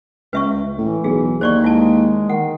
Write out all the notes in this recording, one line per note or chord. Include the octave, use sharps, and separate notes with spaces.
C#2 B4 E5 C#6
A2 E3
B1 G#4
D#2 C5 D5 C#6
G#3 E4 A5
D#3 F#5